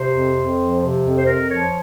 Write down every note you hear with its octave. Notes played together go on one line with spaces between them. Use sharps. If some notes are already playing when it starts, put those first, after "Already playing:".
Already playing: C3 C5
F2
F2
F3
C3
F2
C5
F2 A#4
F3 C#5